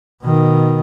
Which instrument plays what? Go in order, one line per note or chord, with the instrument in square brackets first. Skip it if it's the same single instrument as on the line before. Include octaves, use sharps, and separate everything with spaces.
[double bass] B2 D#3